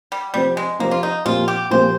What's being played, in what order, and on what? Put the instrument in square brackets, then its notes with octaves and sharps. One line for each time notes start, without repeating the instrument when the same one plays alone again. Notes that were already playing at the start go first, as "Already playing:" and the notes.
[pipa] G3
[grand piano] C3 F3 C4 G4 C5 [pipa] G3
[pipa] G#3
[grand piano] C3 F3 C4 G4 C5 [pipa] A#3
[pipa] F4
D#4
[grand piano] A#2 F3 C4 G4 [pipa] F4
[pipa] G4
[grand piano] A#2 F3 C4 G4 [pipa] C5